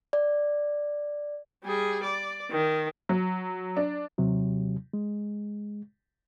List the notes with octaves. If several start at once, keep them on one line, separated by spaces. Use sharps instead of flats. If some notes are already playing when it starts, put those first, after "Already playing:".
D5
G3 G#4
D5
D#3
F#3
D4
D#2 C3 F#3
G#3